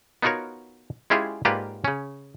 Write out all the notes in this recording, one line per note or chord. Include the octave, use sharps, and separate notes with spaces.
B3 D#4 F4 F#4 A#4 C#5
G#3 C#4 E4 F4 G4 G#4
G#2 A#3 F4 G4 B4 D5
C#3 C#4